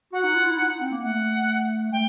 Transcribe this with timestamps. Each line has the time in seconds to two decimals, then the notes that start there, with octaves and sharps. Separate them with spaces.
0.12 F#4 F#5
0.24 D#4
0.35 F4
0.47 E4
0.57 D#4
0.81 C4
0.91 A#3
1.03 A3 F#5
1.92 A3 G5